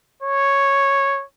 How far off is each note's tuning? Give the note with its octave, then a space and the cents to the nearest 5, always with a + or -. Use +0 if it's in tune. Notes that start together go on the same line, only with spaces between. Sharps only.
C#5 -5